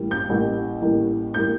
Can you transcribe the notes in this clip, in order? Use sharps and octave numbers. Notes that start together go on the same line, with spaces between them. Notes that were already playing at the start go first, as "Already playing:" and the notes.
Already playing: A1 A2 E3 G3 A#3
G6
A1 A2 E3 G3 A#3
A1 A2 E3 G3 A#3
A2 E3 G3 A#3 G6